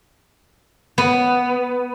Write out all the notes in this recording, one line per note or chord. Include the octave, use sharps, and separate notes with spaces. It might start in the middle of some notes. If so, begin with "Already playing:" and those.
B3